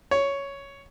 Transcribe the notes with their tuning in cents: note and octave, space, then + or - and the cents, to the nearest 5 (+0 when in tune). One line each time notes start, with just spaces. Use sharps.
C#5 +5